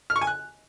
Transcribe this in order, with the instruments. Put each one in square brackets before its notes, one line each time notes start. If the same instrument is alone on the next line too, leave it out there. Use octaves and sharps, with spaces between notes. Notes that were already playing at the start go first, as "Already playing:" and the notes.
[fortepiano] F6
C#6
G#5
F#6